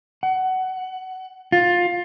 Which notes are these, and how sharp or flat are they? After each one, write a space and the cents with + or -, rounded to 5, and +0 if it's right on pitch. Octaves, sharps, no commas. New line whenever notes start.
F#5 +20
F4 +15